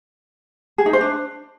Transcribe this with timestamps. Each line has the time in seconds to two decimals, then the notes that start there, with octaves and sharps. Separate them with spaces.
0.78 G#4
0.86 D#4
0.93 C5
1.01 D4